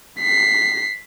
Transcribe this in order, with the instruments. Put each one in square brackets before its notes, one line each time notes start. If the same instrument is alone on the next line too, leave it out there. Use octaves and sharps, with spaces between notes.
[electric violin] B6 C7